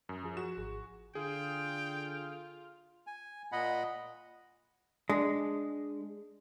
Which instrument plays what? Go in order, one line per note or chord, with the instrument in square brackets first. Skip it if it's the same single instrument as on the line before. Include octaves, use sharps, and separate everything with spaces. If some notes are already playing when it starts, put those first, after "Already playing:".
[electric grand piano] F#2
[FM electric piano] F3 G#4
[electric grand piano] F#4 E7
[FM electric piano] G#1 G#4
[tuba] D3 [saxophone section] F4 [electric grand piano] G#4 [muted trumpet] G5
[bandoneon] G#5
A#2 D#5 F#5 B5
[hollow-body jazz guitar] G#3 [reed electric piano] D4